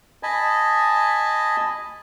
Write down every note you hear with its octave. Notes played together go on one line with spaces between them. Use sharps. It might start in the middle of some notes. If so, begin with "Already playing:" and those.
D#5 G#5 A5 B5